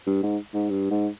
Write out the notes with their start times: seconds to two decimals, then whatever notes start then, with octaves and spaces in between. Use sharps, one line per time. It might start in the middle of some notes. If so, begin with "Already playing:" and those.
0.06 G2
0.23 G#2
0.54 G#2
0.69 G2
0.91 G#2